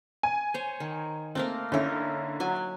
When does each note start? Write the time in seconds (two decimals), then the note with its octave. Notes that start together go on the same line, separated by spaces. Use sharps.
0.23 G#5
0.54 C5 C#5
0.80 D#3
1.35 A3 A#3 C4 A#4
1.72 D3 C#4 D#4 E4 A#4
2.40 F#3 G#5